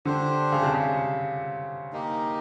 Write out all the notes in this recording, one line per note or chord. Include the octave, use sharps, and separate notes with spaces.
D3 D4 G4 C5
C#3
C3
C#3
A#3 D#4 G4